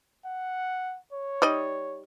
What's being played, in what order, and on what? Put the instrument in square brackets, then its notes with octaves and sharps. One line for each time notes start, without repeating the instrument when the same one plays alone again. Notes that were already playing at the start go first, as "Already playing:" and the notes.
[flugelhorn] F#5
C#5
[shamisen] G3 D#4 D#5